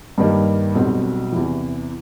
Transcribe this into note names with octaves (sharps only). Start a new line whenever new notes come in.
G2 D#3 G3 A#3
B1 B2 G3 C4
E2 C3 E3